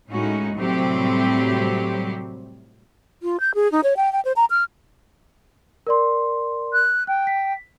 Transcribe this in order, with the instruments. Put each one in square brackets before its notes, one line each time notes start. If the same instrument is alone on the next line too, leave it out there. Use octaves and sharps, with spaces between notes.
[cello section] A2 G#3 C#4 D#4 F#4
A2 C3 F#3 G3 C4 G4
[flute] F4
G6
G#4
D#4
C#5
G5
G5
C5
A#5
F6
[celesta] A#4 D5 C6
[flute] F#6
[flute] G5 [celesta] F#6
[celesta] B6